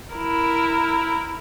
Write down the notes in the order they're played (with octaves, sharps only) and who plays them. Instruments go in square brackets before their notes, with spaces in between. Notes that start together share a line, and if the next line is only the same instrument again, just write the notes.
[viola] E4 A#4